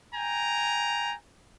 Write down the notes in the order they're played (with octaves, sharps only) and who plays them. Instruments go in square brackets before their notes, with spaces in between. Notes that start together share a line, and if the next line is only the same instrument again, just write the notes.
[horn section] G5 G#5 A#5